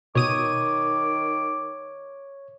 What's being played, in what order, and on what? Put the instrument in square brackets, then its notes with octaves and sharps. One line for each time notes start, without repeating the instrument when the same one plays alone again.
[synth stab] B2 D#6 D#7 [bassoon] D#3 [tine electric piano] C#5 [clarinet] D6